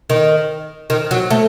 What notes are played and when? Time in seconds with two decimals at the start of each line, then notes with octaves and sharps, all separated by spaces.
0.10 D#3
0.90 D#3
1.11 F#3
1.30 A3